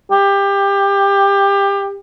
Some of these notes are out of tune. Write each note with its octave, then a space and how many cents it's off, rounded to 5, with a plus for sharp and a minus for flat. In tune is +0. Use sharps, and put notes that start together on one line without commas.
G4 +20